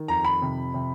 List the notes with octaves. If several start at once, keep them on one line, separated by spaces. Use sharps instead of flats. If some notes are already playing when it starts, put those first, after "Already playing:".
Already playing: D#3
F2 A#5
B5
C3
C3